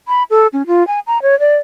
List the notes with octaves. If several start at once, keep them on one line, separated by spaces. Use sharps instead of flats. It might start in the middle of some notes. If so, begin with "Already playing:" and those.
B5
A4
C#4
F4
G#5
A#5
C#5
D5